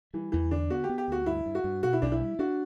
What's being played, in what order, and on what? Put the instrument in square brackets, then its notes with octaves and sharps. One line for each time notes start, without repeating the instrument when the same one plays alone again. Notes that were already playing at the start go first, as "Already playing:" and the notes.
[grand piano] E3 [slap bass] G3
[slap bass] E2 [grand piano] E3
[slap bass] D3 [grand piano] D4
[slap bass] B3 [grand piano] F#4
[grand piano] G4
[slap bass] B3
[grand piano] G4
[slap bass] D2 [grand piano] F#4
[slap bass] G2 [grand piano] E4
[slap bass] G2
[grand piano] F#4
[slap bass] G2
[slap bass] B2 [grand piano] F#4
[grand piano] E4
[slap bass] B1 [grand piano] D4
[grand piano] E4
[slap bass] G3
[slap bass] D4 [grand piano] F#4